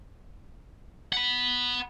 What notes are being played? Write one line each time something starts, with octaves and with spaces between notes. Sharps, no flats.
F#5 B5